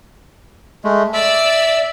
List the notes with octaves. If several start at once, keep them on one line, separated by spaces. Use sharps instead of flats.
G#3 A3
D5 E5 E6